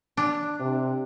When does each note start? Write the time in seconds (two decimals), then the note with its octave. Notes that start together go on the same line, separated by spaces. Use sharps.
0.17 D4
0.60 C3